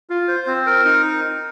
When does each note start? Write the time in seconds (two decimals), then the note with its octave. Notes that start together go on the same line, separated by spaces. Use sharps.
0.10 F4
0.28 C5
0.47 C4
0.66 A#4
0.85 D#4